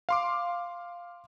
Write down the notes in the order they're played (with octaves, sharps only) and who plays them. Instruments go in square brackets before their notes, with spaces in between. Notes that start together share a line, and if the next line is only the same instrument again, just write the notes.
[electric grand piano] F5 C6 D6